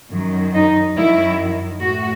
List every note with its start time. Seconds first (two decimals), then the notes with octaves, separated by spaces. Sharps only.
0.11 F#2 D#3 F#3
0.55 D#4
0.97 F#2 D#3 F#3 E4
1.82 A2 F#4